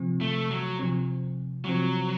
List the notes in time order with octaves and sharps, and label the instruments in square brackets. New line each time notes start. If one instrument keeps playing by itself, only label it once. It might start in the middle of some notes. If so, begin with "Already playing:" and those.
Already playing: [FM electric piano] C3 F3 C4
[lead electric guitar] A3
F#3
[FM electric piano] C3 F3 C4
[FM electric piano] C3 F3 C4 [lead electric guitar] F#3